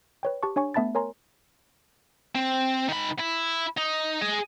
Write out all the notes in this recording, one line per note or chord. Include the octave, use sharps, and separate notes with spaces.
B4 C#5 G5
G4 A5 C#6
D4 C#5 G#5 C#6
A3 B3 E5 A5 B5 A6
A#4 C#5 G#5 A#5 C6
C4
D#3 B5
E4
D#4
G#4 D#5